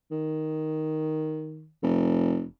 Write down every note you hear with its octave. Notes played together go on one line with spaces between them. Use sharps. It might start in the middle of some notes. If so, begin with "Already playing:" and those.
D#3
F1